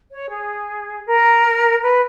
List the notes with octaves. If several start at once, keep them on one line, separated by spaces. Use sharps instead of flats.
C#5
G#4
A#4
B4